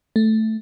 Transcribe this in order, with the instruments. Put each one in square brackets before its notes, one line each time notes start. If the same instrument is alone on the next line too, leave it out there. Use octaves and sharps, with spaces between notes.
[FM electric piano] A3